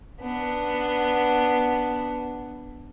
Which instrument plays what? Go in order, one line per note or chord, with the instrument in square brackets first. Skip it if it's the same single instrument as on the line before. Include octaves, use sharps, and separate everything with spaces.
[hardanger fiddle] B3 D4